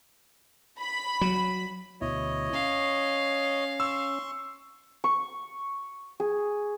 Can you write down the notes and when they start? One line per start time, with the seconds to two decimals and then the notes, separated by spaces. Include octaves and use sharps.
0.79 B5
1.21 F#3
2.01 D2 B2 E4 C#5 D#5
2.53 C#4 F5
3.80 C6 C#6 E6
5.04 C#6
6.20 G#4